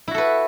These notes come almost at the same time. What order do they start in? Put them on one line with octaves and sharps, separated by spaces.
E4 F#4 A4 B4